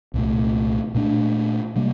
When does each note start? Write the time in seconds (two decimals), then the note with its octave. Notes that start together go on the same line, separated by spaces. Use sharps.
0.14 C2 A#2 A3
0.95 A#2 A3 D4
1.76 C3 G3 A#3